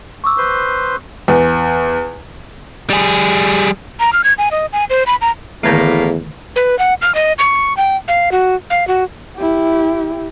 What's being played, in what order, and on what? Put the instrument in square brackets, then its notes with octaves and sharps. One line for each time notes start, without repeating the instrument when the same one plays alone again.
[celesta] C#6 D6 E6
[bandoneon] B4 C5 C6
[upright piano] E2
[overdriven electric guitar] G3 G#4
[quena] A#5
F6
G#6
G#5
D#5
G#5
C5
B5
A#5
[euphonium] E2 [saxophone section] A2 A#3 [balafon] D3 D#3 A3
[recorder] B4
F#5
F6
D#5
C#6
G5
F5
F#4
F5
F#4
[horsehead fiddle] E4 G4